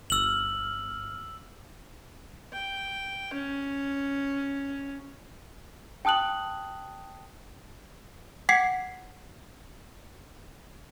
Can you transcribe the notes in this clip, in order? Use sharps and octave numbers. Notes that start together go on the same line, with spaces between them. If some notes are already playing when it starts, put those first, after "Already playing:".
G1 E6 F6 F#7
G5
C#4
G5 A5 D#6 F#6 F#7
F#5 G5 D6 G#6 B6 C7